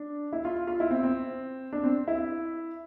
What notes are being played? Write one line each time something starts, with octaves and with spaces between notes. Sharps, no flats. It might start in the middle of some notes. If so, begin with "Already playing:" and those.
Already playing: D4
E4
F4
F4
E4
C4
C4
D4
C4
E4